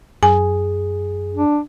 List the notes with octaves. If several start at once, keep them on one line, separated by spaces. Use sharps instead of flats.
F#2 G#4 G#5
D4